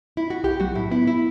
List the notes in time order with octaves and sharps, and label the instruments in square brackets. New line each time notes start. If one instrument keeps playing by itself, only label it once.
[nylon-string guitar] E4
F#4
[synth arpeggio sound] B1 [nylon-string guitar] G4
[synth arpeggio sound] F#3 [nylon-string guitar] F#4
[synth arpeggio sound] A2 [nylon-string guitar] E4
[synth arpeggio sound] B3 [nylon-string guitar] E4
[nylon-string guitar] E4